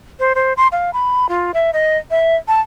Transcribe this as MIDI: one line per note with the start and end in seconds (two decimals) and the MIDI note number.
0.19 0.33 72
0.35 0.53 72
0.57 0.68 84
0.72 0.90 77
0.93 1.27 83
1.29 1.52 65
1.54 1.70 76
1.73 1.97 75
2.11 2.36 76
2.48 2.61 81